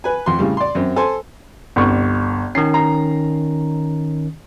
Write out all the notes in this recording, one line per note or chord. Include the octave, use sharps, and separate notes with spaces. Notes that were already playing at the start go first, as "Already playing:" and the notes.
B4 G#5
F2 C6
A2 C#3 G3
D5 C6
F#2 C4
A4 C5 G#5 C6
G1 C2 C#6
D#3 C#4 C7
A#5